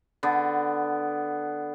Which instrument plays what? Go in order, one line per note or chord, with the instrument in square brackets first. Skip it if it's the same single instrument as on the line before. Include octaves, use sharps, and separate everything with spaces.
[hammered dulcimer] D3 B3